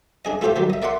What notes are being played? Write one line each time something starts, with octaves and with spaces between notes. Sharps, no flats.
D4 G#4 D#5
A3 E4 F4 G4 C5 F5
D#3 F#3 G3 G4
D#5 E5
A#4 D5 E5 F#5 C6